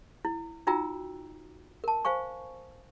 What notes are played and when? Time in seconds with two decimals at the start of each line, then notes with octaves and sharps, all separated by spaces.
0.25 E4
0.67 D#4 F4 F#4 G5 A#5 E6
1.84 A#4 A5
2.05 C5 F5 G#5 C#6